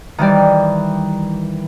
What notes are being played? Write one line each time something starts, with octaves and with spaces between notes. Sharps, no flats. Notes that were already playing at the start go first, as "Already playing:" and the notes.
D#3 E3 G3 D5